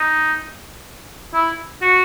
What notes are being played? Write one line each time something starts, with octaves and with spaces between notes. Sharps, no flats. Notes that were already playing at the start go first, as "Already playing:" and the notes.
Already playing: D#4
E4
F#4